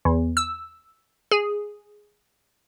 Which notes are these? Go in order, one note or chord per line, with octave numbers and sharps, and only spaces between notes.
E2
E6
G#4